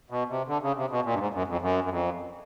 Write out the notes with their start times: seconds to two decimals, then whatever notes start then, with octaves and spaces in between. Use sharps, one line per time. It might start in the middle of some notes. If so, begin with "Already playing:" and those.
0.10 B2
0.29 C3
0.48 D3
0.62 C#3
0.76 C3
0.91 B2
1.05 A#2
1.14 G2
1.19 G#2
1.33 F#2
1.47 F2
1.61 F#2
1.84 F#2
1.90 F2